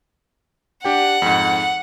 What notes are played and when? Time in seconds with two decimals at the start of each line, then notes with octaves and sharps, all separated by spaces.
0.85 D4 G4 F#5 G5
1.22 F2 G#2